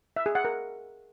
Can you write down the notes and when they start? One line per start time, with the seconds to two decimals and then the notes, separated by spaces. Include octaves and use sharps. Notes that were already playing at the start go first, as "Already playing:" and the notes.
0.16 E5
0.26 G#4
0.35 F#5
0.45 A#4